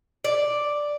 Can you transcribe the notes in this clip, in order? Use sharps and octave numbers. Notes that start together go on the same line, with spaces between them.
D5